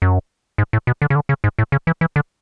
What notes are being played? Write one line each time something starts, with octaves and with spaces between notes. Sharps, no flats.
F#2
G#2
A2
B2
D3
C#3
D3
C#3
G#2
A2
C#3
E3
E3
D3